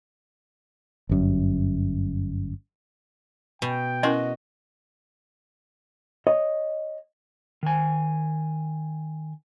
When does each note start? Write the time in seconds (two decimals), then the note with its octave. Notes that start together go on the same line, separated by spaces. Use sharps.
1.09 G1 F#2
3.62 B2 G5
4.03 C#4 E4 F#4 A#4 D#5
6.27 C#5 D#5
7.63 D#3 G#5